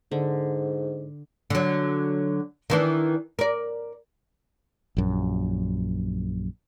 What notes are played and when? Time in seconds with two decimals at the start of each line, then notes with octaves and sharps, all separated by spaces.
0.12 G#2 D3
1.50 D3 F#3
2.70 D#3 E3 D4
3.39 A#4 D5
4.97 A#1 F#2